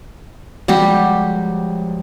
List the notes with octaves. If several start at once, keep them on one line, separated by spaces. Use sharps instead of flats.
F3 G3 G#3 F#4 G4